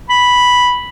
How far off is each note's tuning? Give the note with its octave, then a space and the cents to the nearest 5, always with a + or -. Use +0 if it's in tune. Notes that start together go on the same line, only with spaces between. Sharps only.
B5 -5